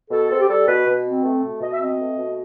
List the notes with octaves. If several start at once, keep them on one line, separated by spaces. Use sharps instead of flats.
B2 A4
C4 A4
G4
G3 A4
B2 B4
B2
C4
A3
B2
B2 D#5
E5
C4 D#5
A3
B2